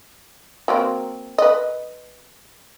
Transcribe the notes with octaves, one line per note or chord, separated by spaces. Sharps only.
F#3 A#3 C4
B4 D#5